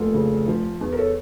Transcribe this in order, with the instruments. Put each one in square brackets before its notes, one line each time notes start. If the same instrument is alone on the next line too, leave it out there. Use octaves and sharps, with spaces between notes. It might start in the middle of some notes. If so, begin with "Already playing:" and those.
Already playing: [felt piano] F1 A#3 F4 A4
C#3
F3
E2
A#4
A4 C#5